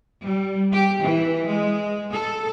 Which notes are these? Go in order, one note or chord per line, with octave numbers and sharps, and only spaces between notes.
G3
G4
E3
G#3
A4